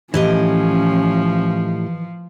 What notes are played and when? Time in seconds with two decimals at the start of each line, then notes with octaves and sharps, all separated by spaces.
0.14 A2 E3 F3 C#4 G4 D#5